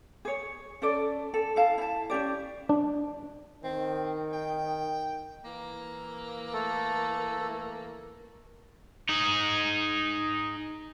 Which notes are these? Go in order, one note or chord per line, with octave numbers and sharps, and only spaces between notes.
G#4 C#5
C#4 A4 D5
A4
E4 A4 F5 A5
E4 A5
C#4 D4 G4 D5
D4
D#3 C4
G5
E3 A#3
A3 A4
D#4 G#4